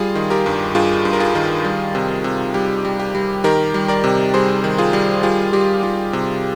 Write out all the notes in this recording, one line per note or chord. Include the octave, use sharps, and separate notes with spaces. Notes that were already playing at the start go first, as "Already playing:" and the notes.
Already playing: G3 F4 G#4
D#3
G4 A#4
G2
G2 F4 G#4
G2
A#4
F4 G#4
D#3
G3
C3
C3
G3 G4
G3
G4
G3
D#3 G4 A#4
G3
A#4 D5
C3
G3 G#4 C5
D#3
F4 G#4
G3
G3 F4 G#4
G3 G4
G3 F4
C3